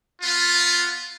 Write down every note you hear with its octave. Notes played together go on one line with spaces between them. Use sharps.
B3 F4